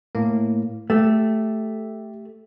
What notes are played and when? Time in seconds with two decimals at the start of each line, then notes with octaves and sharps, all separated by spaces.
0.15 A2 A#3
0.90 A3 G4